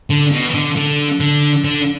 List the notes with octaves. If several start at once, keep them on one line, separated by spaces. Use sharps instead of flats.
D3
B2
E3
D3
D3
D3
D3